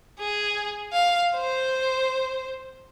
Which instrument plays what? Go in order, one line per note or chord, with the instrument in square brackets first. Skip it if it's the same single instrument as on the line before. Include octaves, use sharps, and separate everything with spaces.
[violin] G#4
F5
C5